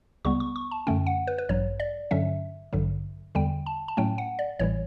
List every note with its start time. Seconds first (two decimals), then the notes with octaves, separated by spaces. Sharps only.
0.25 C#2 C#3 G3 B3 C#6
0.40 C#6
0.56 C#6
0.71 A5
0.87 F#2 D3 A3 C#4 G5
1.07 F#5
1.27 B4
1.38 B4
1.49 A1 G2 F#3 C#5
1.80 D5
2.11 G2 D3 F#3 C#4 E5
2.73 A1 G2 D3 F#3
3.35 E2 D3 G3 G5
3.66 A5
3.88 A5
3.97 A2 F#3 A3 C#4 G5
4.18 F#5
4.39 D5
4.59 A1 A2 E3 G3 C#5